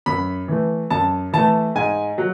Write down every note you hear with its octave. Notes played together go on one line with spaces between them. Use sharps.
F#2 B5
E3 A3
F#2 A5
E3 A3 A5
G#2 G#5
F#3